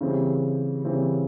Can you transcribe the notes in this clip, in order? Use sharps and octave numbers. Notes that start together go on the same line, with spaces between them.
C#3 E3 G3 C4
C#3 E3 G3 C4